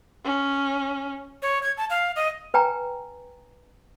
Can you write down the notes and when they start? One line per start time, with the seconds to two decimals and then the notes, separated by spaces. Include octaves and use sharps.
0.24 C#4
1.42 C#5
1.63 G#6
1.77 A5
1.90 F5
2.16 D#5
2.54 B4 G5 G#5 A#5